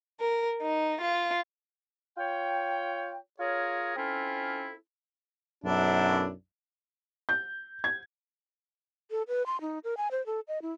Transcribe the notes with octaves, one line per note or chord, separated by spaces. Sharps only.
A#4
D#4
F4
F4 C#5 G5
F4 G#4 A#4 C#5
C4 C#4 E4 F4 A4
B1 F#2 D4 E4
G6
G#6
A4
B4
C6
D#4
A#4
G#5
C5
A4
D#5
E4